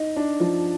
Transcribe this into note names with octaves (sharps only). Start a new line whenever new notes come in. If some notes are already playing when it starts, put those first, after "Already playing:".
Already playing: D#4
D4
F3